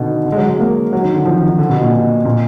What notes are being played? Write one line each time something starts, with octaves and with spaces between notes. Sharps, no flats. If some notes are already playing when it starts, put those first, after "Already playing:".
Already playing: B2 D3 D#3
D3
G#3
F#3
G#3
A#3
F#3
D#3
D3
F3
D#3
D#3
D3
B2
A#2
B2
A#2